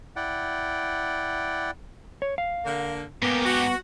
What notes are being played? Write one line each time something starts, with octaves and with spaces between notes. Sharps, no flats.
E4 D5 F#5 G5
C#5
F5
D3 A#3
G#2 A#3 B3 G4
F#4